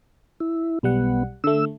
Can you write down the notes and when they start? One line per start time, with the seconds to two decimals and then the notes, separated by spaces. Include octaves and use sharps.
0.40 E4
0.83 B1 G3 B3 F#5
1.44 D3 A3 E6